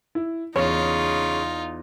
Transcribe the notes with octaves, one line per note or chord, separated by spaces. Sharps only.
E4
E2 C#3 D#4 F4 C#5